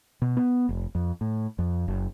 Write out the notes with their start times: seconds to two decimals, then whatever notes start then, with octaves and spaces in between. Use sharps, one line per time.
0.22 B2
0.37 B3
0.69 F1
0.95 F2
1.21 A2
1.59 F2
1.88 F#1